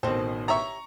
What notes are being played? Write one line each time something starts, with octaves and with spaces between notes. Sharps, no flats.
A1 B2 D#3 C4 A4 C5
G4 C#5 E5 A#5 C#6